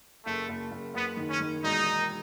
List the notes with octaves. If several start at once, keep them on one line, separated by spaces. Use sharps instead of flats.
F#1 A3
F#1
F#1
F#1 B3
D#3
C#4
D#3
E1 D#4
E1